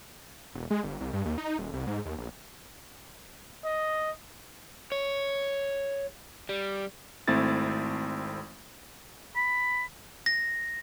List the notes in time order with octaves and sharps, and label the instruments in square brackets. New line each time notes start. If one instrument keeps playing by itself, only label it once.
[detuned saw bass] E1
G#3
G1
C2
G2
D#2
D#4
D#1
C2
G#2
D#2
A#1
[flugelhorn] D#5
[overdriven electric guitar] C#5
G3
[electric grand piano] G#1 A3 C4 E4 A6
[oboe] B5
[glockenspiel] A#6